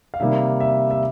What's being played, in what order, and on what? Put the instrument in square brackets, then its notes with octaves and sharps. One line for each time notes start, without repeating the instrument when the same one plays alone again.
[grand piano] F5
C3 D#3 G3 A#3 E5
E5
E5